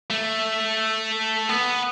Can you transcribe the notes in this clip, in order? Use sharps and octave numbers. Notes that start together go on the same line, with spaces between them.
A3
B3